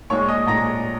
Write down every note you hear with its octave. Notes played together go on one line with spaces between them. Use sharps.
A#1 A#2 G#3 C#5 C#6
D#5 D#6
A#1 A#2 G#3 A#5 A#6